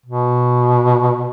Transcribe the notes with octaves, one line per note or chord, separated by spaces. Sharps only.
B2